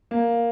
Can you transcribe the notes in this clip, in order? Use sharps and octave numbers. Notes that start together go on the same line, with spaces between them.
A#3